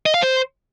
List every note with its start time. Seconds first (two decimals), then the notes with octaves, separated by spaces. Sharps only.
0.06 D#5
0.14 F5
0.22 C5